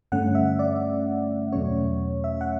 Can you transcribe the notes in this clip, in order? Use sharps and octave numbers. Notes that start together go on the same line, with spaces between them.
G2 D3 A3 C#4 F#5
E5
D5
E2 B2 F#3 A3 C#4 C#5
E5
F#5